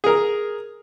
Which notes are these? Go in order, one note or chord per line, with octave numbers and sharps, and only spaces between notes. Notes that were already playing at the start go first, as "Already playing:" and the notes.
G#4 A#4